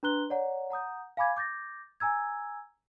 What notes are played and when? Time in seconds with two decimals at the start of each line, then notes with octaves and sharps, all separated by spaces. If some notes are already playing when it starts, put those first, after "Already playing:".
0.03 D4 B4 A#5 C6 F#6 G7
0.30 C#5 D5 F#5 A#5
0.70 F#5 A#5 D#6 G6
1.17 F5 G#5 B5 D6 G#6
1.37 D6 G6 A6 A#6
2.00 G#5 A#5 E6 G#6